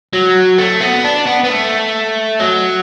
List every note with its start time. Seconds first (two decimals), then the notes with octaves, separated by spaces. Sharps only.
0.13 F#3
0.59 A3
0.81 B3
1.04 D4
1.26 B3
1.44 B3
1.49 A3
2.40 F#3